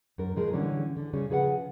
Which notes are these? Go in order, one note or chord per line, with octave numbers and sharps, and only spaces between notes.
F#2 A#4
A2 F3 G#3 A#4
D3 E3 G3 C#4
D3
C#3 G3 C#4 G#4
C#3 F3 G#4 B4 F5 F#5